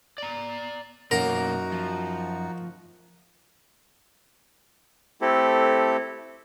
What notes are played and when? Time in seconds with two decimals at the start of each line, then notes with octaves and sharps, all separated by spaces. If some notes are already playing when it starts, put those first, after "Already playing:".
0.18 D5 A#5
1.11 B1 F#2 A#3 D#4 F#4 A#4 F#5
1.72 F3
5.21 A3 C4 E4 G4 A4